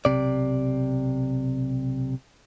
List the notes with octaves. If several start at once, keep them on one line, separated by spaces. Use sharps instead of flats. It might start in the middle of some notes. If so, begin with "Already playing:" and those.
B1 C3 D5